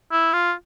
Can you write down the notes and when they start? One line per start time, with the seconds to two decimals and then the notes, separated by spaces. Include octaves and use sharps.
0.12 E4
0.33 F4